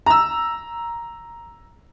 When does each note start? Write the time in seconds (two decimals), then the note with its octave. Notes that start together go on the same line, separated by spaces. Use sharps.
0.06 A#5 E6